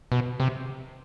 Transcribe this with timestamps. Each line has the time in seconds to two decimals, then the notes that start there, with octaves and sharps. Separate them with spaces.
0.12 B2
0.40 C3